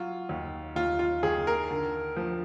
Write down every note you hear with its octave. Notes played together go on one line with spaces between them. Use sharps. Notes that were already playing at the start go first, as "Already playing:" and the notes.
Already playing: F#3 F4
D#2
D#2 F4
F4
D#2 G#4
A#4
D3
F3